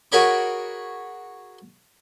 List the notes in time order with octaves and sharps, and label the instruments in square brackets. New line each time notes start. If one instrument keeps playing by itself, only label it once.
[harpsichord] F#4 G#4 A#4 C#5 B5 D6